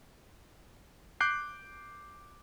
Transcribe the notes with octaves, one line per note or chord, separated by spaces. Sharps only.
D6 F#6 G6 C7